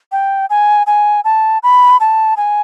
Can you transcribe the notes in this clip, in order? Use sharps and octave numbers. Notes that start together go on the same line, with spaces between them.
G5
G#5
G#5
A5
B5
A5
G#5